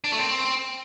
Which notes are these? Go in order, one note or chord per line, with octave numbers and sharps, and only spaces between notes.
D4
A3
C4